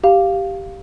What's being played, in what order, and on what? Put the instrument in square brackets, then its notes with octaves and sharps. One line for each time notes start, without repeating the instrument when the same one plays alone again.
[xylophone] G4 F5